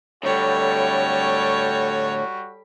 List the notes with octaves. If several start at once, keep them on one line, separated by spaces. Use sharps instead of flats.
A2 D3 G3 F#4 A4 C#5